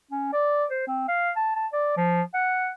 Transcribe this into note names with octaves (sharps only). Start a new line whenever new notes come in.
C#4
D5
C5
C4
F5
A5
A5
D5
F3
F#5